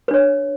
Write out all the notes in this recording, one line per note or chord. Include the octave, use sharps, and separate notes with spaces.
D4 B4 C#5